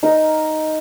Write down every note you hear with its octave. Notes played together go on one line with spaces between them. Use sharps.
D#4 A#4 D#5